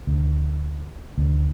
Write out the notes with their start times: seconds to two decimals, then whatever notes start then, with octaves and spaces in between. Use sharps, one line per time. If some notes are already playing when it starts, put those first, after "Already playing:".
0.07 D2
1.18 D2